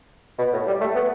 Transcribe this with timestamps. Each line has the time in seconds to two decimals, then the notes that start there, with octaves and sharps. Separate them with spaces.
0.39 B2
0.53 A2
0.67 G3
0.81 A3
0.95 B3